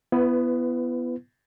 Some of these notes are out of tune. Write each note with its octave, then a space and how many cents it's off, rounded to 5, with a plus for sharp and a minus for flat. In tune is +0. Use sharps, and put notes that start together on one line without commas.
B3 +0 E4 +35 B4 +25